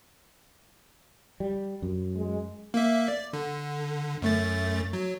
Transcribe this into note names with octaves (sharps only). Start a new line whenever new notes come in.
G3
F#2
G#3
A#3 E5
D5
D3
F#2 A3 A6
F#3